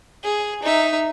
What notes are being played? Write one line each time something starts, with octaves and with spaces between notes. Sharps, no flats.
G#4
D#4 E5